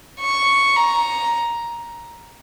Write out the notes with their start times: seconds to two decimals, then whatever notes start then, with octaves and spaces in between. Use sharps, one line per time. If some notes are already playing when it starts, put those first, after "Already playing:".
0.21 C#6
0.76 A#5